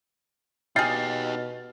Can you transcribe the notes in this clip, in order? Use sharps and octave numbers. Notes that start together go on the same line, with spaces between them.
B2 D#4 G4 G#4 G5 F6 A6 C7